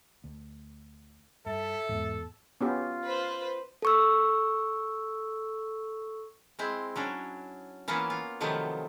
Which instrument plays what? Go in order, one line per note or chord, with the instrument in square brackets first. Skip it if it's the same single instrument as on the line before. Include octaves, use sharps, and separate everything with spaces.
[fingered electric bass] D2
[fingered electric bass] G2 [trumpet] A4 [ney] E5
[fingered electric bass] E2 G3 B3 [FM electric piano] G#2
[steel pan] B3 C#4 G4 [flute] F4
[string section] B4 C5
[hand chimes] A4 C#6 E6
[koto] G#3 C4 E4
F#3 C#4 D4
E3 A#3 B3 C#4 E4 F4
F4
C3 D#3 F3 F#3 A3 B3